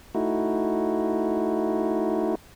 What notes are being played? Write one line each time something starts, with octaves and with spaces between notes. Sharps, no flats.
A3 D#4 E4 F#4